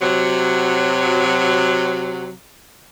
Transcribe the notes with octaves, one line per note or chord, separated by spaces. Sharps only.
C3 F#3